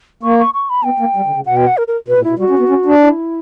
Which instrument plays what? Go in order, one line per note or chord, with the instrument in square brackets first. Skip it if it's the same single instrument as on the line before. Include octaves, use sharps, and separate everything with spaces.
[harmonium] A#3 [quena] C#6
[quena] C#6
C#6
B5
[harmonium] B3 [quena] G5
[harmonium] A#3
G3
D3
C#3
[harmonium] B2 [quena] F#5
[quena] G5
F#5
A#4
A#4
[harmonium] B2 [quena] B4
[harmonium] A#2
[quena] E4
[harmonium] B2
[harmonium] G3 [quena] F#4
[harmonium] C#4
B3
C#4
D4
[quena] E4